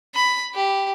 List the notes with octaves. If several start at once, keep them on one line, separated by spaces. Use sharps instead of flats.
B5
G4